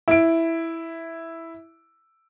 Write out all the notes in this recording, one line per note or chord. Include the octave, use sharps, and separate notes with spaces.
E4 D7